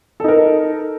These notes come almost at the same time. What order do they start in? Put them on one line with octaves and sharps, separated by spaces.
A4 D#4 A#4